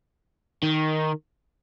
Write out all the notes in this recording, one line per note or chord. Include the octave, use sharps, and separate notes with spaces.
D#3